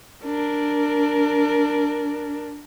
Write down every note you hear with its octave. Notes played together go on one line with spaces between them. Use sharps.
D4 A#4